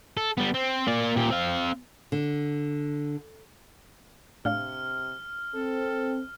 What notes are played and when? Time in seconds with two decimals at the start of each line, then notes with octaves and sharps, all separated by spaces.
0.17 A4
0.38 G3 B3
0.54 C4
0.87 A#3 D5
1.16 A#2 G4
1.31 C4 F5
2.12 D3
4.45 A2 C3 D4 F5 F6
5.55 C4 A4